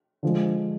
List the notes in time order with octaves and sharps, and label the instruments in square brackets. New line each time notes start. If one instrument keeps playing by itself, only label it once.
[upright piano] D3 F3 G#3